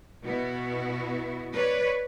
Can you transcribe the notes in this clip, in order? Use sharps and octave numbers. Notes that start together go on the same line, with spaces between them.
B2 B3 E4 F#4
B4 C#5 D5